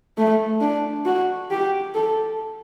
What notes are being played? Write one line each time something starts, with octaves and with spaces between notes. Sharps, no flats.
A3
D4
F#4
G4
A4